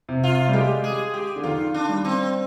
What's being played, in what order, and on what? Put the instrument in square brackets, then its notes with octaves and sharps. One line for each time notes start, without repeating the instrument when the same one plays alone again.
[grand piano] C3
[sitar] F4
[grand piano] G3
[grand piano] G#3 [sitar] G4
[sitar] G#4
G4
[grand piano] D3
[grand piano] D#3 [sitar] F4
[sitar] D4
[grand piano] G3
[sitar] C4